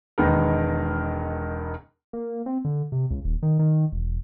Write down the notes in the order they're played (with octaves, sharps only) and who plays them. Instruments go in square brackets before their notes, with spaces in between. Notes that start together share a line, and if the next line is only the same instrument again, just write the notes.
[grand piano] E1 D#3 G#3 B3 D#4 A#4
[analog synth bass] A#3
C4
D3
C3
C#2
D#1
D#3
D#3
E1